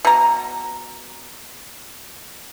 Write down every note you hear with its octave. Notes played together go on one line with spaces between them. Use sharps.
B2 A#5